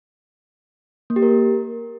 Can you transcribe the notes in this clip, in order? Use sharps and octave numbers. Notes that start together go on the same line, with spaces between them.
A#3
G4
A#4